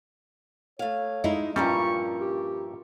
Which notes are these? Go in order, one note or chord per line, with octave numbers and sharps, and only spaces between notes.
A3 C#5 F5
G#3 D#4 E4
G2 A#2 F3 G3 C#4 A#4 E5 C#6
G4